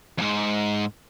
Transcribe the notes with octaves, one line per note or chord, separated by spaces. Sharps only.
F2 G#2